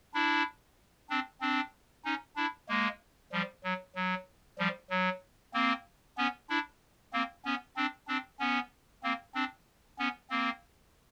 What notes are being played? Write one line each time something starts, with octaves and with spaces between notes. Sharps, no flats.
D4 E4
C4 D4
C4 D4
C#4 D#4
D4 E4
G#3 A#3
F3 G3
F#3
F#3
F3 G3
F#3
A#3 C4
B3 C#4
D4 E4
A#3 C4
B3 C#4
C4 D4
C4 D4
B3 C#4
A#3 C4
C4 D4
B3 C#4
A#3 C4